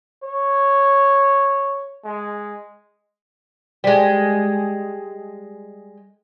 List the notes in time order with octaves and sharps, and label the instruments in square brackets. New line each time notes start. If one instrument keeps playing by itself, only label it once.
[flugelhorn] C#5
G#3
[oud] G3 G#3